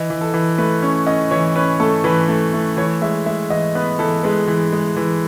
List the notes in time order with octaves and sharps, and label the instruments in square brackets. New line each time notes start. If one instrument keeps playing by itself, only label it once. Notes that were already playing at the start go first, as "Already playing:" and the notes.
Already playing: [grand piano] E3 D#5
E3
A4
E3
A3 B4
C#4
C#4 D#5
E3 C#5
C#4 B4
A3 A4
E3 B4
A3
A3
E3 C#5
G#3 E5
G#3 E5
E3 D#5
B3 B4
E3 A4
G#3 B4
E3
G#3
E3